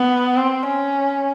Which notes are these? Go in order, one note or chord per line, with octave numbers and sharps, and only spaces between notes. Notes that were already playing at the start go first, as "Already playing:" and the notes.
Already playing: B3
C4
C#4